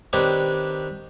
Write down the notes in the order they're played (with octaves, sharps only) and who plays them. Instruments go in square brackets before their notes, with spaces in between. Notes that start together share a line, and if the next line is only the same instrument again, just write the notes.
[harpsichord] D#3 C4 D4 G4 B4 C#5